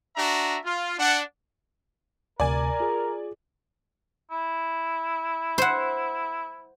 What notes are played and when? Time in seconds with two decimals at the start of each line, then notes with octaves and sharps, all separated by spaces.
0.15 D4 F#4 E5 A#5
0.65 F4
0.97 D4 F#5
2.40 D2 C3 A#4 D5 G#5
2.80 F4 G#4
4.31 E4
5.58 C5 F#5